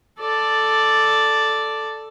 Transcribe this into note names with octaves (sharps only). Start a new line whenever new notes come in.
A4 D5